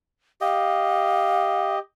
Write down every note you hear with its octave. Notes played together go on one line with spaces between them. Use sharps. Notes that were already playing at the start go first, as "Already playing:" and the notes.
G4 D#5 F5